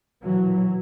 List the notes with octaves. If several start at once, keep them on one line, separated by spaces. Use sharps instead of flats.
B1 A#2 E3 F#3